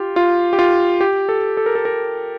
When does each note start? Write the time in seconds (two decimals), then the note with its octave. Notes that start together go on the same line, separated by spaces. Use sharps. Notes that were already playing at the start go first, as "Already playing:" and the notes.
Already playing: F4 G4
0.16 F4
0.53 G4
0.59 F4
1.01 G4
1.29 A4
1.57 A4
1.66 A#4
1.75 A4
1.85 A#4